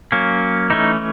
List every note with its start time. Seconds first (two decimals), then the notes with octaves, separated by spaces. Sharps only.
0.12 F#3 A#3 C#4
0.70 E3 A3 C#4 D#4